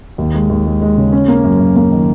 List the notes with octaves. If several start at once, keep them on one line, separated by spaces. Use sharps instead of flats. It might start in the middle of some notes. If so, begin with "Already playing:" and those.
D#2
G#3
D#2
G#3
G#3
C#3
C#4
A#3
F#2
F#2
A#3
D#3